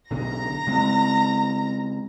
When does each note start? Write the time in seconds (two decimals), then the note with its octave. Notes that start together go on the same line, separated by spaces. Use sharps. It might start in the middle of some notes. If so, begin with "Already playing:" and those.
0.11 B1 B2 D3 A#5 A#6
0.67 C#3 G#3 C4